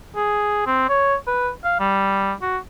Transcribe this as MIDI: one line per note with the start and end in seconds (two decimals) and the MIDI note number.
0.16 0.63 68
0.67 0.86 60
0.89 1.15 73
1.27 1.50 71
1.64 1.77 77
1.80 2.33 55
2.42 2.58 66